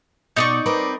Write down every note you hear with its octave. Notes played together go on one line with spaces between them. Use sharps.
B2 D#4 D5 C#6
C4 A#4 B4